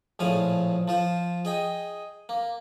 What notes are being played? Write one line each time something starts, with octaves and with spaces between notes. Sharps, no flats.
A#1 A2 F3 G#4 F5 D#6
F3 F4 C5
G#4 D#5 G5
A#3